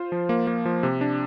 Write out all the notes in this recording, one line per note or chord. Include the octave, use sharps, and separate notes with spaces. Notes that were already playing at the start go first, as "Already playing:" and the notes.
Already playing: F4 C5
F3
A#3
A#3
F3
C3
D4